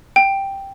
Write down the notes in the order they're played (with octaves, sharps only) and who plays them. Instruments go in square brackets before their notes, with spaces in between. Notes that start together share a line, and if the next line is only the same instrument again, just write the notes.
[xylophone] G5